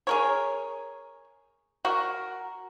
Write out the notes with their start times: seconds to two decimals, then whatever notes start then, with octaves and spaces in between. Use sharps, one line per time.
0.07 G#4 A#4 C#5
1.85 F#4 A#4